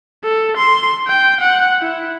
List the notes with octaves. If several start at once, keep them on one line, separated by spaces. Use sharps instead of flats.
A4
C6
G5
F#5
E4